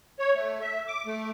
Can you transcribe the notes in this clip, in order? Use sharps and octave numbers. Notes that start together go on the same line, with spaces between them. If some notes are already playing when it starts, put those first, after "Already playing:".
C#5
A3
E5
D6
A3